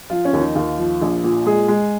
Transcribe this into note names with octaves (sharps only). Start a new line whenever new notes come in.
F3 F4
C#4
D#2
D#4
D#2 F4
F3
A#1
A#2
G#3 G#4
G#3